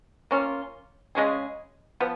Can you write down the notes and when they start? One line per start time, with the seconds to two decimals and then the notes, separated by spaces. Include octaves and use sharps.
0.31 A#3 C#4 F4
1.15 C#3 G#3 C#4 G#4
2.00 F3 B3